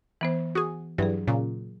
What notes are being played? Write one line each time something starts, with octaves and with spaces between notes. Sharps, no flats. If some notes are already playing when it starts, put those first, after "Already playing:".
E3 B3 C5
F#4 G#4 D#6
G2 E3 F#3 G#4
A#2 C#3